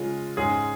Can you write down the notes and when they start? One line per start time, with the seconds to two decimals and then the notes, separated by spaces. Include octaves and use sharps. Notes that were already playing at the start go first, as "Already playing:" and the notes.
Already playing: C#3 G#3 F4
0.37 G#2 G#3 C#4 G#4